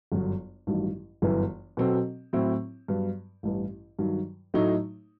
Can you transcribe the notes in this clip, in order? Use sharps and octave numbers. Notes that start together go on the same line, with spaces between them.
G1 F#2 F#3
A1 G2 D#3 F#3
G1 F#2 E3 B3 E4
B2 F#3 C4 F#4 A4
A2 F#3 C4 E4
G2 F#3 B3
A1 G2 E3
G2 D#3 F#3
A2 F#3 A3 D#4